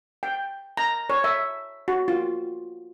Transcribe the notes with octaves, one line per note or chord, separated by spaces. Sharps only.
G5
A#5
C#5
E5
F#4
F4